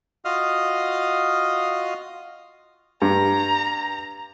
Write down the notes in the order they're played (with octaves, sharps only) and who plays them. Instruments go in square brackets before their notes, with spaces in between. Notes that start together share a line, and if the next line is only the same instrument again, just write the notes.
[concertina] F4 F#4 D#5 F5 D#6 F6
[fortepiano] G2 [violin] A#5